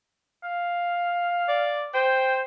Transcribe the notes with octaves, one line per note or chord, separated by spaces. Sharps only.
F5
D5
C5 G5